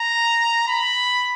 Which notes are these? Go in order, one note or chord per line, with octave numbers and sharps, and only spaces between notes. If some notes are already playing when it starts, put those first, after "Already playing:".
Already playing: A#5
B5